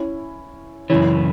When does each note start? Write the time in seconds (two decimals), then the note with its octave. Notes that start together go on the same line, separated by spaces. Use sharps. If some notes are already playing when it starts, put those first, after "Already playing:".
Already playing: C#4 E4
0.90 F#2 C#3 E3 C#4 E4